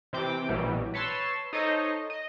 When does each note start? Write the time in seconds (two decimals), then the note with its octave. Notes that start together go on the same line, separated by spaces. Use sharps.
0.13 C3 E3 C4 G5 D6
0.49 A#1 B2 E3 F#3 G3
0.94 B4 C#5 A5 C6 E6
1.53 D#4 A4 C5 C#5 D#5
2.10 D#5